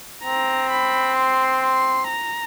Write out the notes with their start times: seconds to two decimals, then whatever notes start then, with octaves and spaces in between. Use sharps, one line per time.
0.24 C4 A#5
0.70 B5
1.17 C6
1.63 C6
2.09 A#5